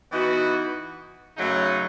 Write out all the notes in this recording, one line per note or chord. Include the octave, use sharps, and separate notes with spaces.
E3 B3 D#4 F#4
F#2 C#3 F#3 A3 D#4